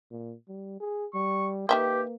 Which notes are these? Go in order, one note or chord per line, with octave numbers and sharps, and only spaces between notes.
A#2
G3
G#4
G3 C#6
D#3 A#3 G4 B4 E5 G5